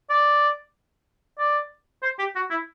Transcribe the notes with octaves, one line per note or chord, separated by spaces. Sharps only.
D5
D5
C5
G4
F#4
E4